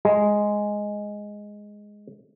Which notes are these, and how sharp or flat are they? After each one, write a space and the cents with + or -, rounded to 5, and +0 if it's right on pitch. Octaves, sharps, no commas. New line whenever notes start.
G#3 +0